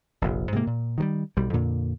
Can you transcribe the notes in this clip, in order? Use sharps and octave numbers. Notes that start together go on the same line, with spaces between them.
F1 A#1
G#2 C3 A#3
A#2
D#3 F#3 G3
B1 G3
F2 A#2 D3